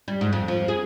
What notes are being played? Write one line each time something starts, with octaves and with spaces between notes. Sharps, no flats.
G3
G#2
F2
F3
G#4